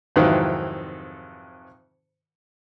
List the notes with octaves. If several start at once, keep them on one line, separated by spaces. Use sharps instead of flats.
F2 G#2 C3 D#3 E3 F#3